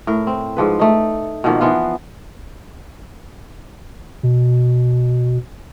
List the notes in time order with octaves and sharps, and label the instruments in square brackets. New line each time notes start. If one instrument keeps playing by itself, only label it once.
[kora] A2 A#4
C4
G#2 F3 B4
A3 D#4
B2 D#3 F3 A#3
E3 F3 B3 F4
[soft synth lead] B2